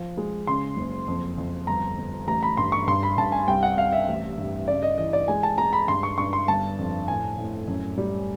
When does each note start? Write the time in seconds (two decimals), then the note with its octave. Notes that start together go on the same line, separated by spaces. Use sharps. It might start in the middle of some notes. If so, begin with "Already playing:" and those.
Already playing: F3
0.17 G#3
0.47 C#3 C6
0.77 F#1
1.08 F2
1.38 F2
1.67 G1 A#5
1.97 G1
2.27 A1 A#5
2.43 B5
2.57 G2 C6
2.72 C#6
2.87 G2 C6
3.03 B5
3.18 G2 A5
3.32 G#5
3.48 C2 G5
3.63 F#5
3.77 C2 F5
3.93 E5
4.08 A1
4.38 G2
4.68 C#3 D5
4.83 D#5
4.98 E3 D#5
5.13 D5
5.28 G#3 G#5
5.43 A5
5.58 G#3 A#5
5.73 B5
5.88 G2 C6
6.03 C#6
6.18 G2 C#6
6.33 C6
6.48 G1 A5
6.79 F2
7.08 A2 G#5
7.38 A2
7.68 F#2
7.98 G3